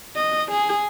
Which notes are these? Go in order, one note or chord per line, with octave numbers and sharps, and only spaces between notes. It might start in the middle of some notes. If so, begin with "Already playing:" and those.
D#5
G#4